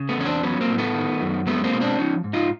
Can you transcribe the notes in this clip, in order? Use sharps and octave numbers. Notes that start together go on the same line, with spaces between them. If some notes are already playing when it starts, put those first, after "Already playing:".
Already playing: C#3
A3 B3
E2 C#4
C4 D4
F#3 B3 C#4
A#3 C4
A2
A3 B3
D#3
F#2
G#3 A3 B3
A#3 C4
B2
C4 D4
F3 C#4 D#4
G#2
D#4 F4